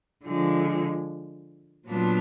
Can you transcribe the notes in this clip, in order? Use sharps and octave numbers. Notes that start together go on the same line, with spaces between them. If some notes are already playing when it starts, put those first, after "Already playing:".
D3 F3 G#3
A#2 F#3 B3 D4 F4